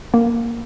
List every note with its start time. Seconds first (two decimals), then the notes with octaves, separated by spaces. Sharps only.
0.14 A#3